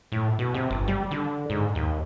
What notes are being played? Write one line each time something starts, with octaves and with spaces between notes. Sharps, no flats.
A2
B2
C3
G1
G3
D3
G#2
D#2